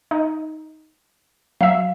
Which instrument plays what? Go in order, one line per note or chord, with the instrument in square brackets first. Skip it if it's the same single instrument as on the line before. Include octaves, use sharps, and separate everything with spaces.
[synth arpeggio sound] D#4
[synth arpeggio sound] F#3 E5 [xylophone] F5